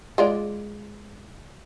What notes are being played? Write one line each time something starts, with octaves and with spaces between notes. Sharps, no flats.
G#3 F4 D5